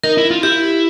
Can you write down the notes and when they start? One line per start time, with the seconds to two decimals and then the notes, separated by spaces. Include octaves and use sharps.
0.04 D#4 A#4
0.17 E4
0.31 F4
0.43 E4 G4